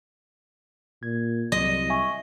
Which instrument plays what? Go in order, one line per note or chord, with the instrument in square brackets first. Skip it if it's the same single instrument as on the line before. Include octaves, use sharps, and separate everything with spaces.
[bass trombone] A#2 [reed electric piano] G#6
[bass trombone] C2 [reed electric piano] F#3 [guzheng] D#5
[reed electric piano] E5 G#5 C#6